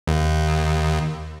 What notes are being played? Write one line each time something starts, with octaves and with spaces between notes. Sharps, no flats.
D#2